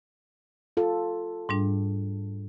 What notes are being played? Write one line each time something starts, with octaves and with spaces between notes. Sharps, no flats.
F4 A4
G#2 G3 D4